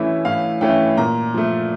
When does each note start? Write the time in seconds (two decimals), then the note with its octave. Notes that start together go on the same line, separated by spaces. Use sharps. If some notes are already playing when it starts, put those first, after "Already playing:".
Already playing: A2 E3 A3 C#4 E4 E5
0.25 A2 F5
0.61 E3 A3 C#4 E4 G5
0.97 A#2 A#5
1.34 F3 A3